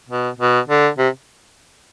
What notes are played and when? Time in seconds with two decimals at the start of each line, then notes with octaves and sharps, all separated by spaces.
0.09 B2
0.39 B2
0.68 D3
0.98 C3